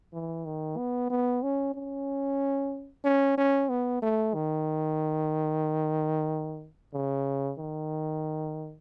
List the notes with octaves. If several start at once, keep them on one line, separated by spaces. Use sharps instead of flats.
E3
D#3
B3
B3
C#4
C#4
C#4
C#4
B3
A3
D#3
C#3
D#3